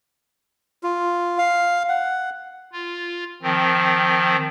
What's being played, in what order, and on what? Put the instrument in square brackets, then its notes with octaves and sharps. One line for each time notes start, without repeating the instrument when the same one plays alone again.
[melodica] F4
F5
F#5
[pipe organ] F4
D#3 F3 C4